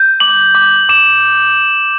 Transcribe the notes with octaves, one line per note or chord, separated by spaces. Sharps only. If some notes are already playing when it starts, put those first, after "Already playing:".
Already playing: G6
D6 F#7
D6
D6 E7